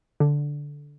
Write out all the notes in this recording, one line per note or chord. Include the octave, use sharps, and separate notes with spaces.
D3